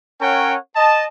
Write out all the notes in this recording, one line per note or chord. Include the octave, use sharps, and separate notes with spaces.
C#4 A#4 C#5 F#5 G5
D#5 A5